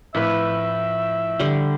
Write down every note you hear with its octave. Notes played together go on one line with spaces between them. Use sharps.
F2 A2 B4 E5
D3 G3